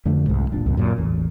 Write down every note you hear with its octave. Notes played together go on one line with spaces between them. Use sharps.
F2 D3 A3
C2 G#2
F1 A#2 D4
C#2 F#2 B2
F#2 A#2
A1 E2